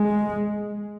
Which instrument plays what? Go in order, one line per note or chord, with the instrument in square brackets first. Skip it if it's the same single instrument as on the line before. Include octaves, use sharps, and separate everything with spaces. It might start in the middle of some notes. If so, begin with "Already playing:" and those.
Already playing: [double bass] G#3